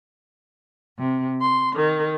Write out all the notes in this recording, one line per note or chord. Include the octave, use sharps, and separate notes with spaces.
C3
C6
D#3